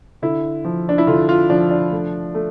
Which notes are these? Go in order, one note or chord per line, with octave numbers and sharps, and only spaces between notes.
D3 E4
F3
D4
E4
D3 F4
F4
F3 D4
D4
A3
A3